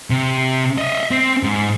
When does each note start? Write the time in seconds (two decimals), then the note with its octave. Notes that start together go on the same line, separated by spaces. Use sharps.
0.10 C3
0.78 D#5 E5
1.11 C4
1.43 G#2